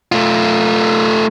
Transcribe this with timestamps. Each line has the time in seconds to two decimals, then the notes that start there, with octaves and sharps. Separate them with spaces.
0.12 A3 F4